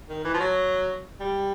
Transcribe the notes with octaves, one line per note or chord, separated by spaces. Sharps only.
D#3
E3
F3
F#3
G3